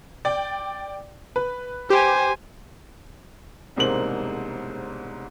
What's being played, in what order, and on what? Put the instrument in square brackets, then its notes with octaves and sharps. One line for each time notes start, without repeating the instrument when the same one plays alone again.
[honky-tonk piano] D5 G5
B4
[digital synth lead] G4 [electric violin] C5 G#5
[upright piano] E1 C2 G#2 A#3 C5 F#7